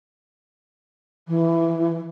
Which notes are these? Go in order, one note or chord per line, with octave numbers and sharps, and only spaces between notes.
E3